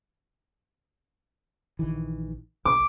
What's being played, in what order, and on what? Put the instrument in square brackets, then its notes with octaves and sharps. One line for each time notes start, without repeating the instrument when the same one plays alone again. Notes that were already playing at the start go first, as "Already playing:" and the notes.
[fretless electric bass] A#1 D#3 E3
[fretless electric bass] B1 [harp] D6